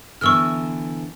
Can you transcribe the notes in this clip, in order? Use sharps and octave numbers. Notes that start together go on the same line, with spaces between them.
D3 E3 B3 C#6 E6 F6